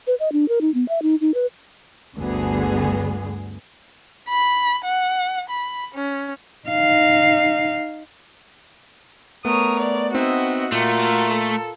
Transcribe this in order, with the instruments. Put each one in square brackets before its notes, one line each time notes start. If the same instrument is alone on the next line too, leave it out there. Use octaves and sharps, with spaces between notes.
[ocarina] B4
D#5
D4
A#4
D#4
B3
E5
D#4
D#4
B4
[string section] G1 D2 G2 D3 B3 G#4
[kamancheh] B5
F#5
B5
C#4
[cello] D#4 F5
[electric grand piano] A3 B3 [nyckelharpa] A#4 C#5 [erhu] D#6
[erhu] D5
[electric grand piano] B3 C4 D#4 [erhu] F#4 [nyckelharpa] D#5 E5
[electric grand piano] A#2 [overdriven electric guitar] A3 [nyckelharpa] F4 A#4
[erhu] A4